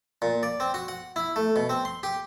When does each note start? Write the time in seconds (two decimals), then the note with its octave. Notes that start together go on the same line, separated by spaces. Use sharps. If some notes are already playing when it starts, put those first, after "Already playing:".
0.22 A#2
0.43 D5
0.60 C4
0.74 F#4
0.88 F#5
1.16 E4
1.36 A3
1.56 B2
1.69 C4
1.85 C6
2.03 G4